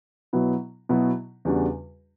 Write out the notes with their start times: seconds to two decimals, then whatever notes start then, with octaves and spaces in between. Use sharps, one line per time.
0.33 B2 F#3 B3 E4
0.89 B2 F#3 B3 E4
1.45 E2 C#3 G3 D4 F#4